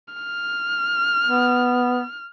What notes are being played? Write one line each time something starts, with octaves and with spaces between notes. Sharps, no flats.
F6
B3